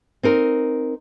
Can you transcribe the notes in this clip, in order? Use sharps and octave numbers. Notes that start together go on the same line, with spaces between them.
C4 D#4 A#4